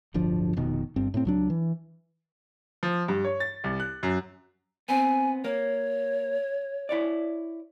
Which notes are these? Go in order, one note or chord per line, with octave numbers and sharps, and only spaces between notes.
D1 G1 D3 F3
F1 B2 D#3
G1 G2 C4
A2 C4
C#2 F#3 D4
E3
F3
G2
C#5
A6
C2
F#6
F#2
B3 C4 G#5
A#3 C#5
E4 C#5 D5